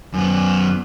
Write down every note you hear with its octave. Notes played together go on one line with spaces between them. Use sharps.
F#2 B3